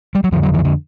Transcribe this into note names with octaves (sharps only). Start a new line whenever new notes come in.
G3
F#3
F2 D3 F3
F#3
E3
D3